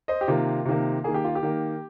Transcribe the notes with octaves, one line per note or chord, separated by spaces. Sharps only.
C5 D#5
G4
C3 D#3 A#3 F4
C3 D#3 A#3
D#3 A#3 G#4
G4
F4
G4
D#3 A#3